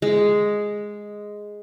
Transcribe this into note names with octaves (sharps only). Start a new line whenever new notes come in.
G#3